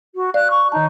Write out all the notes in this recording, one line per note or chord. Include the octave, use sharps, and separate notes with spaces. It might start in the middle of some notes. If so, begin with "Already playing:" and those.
F#4
D5 F5 F#6
C#6
D#3 D#4 A5